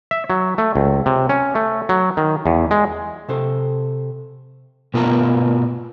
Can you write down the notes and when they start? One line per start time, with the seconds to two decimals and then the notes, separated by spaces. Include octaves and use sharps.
0.11 E5
0.30 F#3
0.58 A3
0.76 C#2
1.06 C3
1.29 C#4
1.55 A3
1.89 F#3
2.17 D#3
2.46 E2
2.71 G#3
3.29 C3 A4 C5
4.94 B2 B3 F4 A#4 A5 A#5